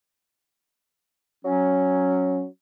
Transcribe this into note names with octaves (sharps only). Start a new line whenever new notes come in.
F#3 C#4